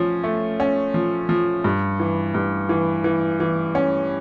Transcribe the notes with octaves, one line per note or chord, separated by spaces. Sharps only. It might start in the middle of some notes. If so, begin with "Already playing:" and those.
Already playing: F3 C#4
A3
C#4
F3
F3
G2
E3
G2
E3
E3
E3
C#4